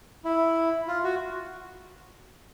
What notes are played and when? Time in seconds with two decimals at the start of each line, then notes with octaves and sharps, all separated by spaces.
0.25 E4
0.88 F4
1.04 F#4